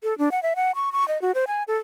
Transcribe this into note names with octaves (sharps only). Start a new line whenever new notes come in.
A4
D4
F#5
E5
F#5
C#6
C#6
D#5
F#4
C5
G#5
A4